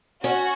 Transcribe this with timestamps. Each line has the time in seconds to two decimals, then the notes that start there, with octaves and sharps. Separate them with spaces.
0.24 C#4 F#4